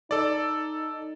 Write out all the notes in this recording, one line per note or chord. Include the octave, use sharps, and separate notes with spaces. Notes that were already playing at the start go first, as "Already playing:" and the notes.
D#4 A4 D5